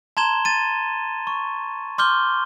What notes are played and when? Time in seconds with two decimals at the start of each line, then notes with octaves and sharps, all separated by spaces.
0.17 A5 A#5 C6 G#6 E7 G7
0.45 A6 D#7
1.27 C#6
1.98 C6 D6 F6 G6 G7